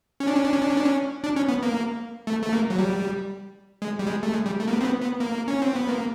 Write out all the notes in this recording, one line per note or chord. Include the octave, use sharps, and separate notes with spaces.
C#4
D4
C#4
D4
C#4
D4
C#4
D4
C#4
D4
C#4
B3
A#3
A3
A3
A#3
F#3
G3
G#3
G3
G#3
A3
G#3
G3
A3
A#3
B3
C4
B3
B3
A#3
C#4
C4
B3
A#3